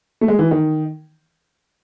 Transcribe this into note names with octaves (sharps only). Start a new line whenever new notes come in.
A3
G#3
E3
D#3